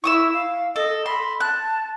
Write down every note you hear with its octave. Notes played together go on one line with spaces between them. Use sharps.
E4 C#6 D#6 E6
F5
A4 D#5
B5 C6
A5 F#6